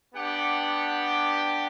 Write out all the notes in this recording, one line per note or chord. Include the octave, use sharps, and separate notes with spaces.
B3 D4 G4 F#5